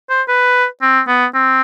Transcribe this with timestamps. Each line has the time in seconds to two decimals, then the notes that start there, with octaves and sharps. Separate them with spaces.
0.10 C5
0.28 B4
0.82 C4
1.08 B3
1.35 C4